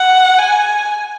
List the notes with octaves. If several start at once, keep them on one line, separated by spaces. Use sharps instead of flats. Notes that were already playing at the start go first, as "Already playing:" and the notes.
Already playing: F#5
G#5